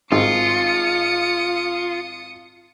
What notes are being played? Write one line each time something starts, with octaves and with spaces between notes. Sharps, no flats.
G#1 F4 D#6 C#7